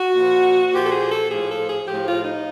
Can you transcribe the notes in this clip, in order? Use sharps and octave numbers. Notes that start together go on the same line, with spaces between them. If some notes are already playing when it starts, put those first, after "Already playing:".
Already playing: F#4
A#2 F3
A#2 F3 G4
A4
G#4
A4
A2 F3 G#4
A4
G#4
A2 F3 G4
F4
D#4